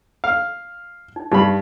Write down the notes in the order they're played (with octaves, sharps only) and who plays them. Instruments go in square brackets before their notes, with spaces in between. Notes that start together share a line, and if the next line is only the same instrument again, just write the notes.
[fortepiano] F5
[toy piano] D#4
[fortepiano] G2 B5 [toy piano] D#4 G4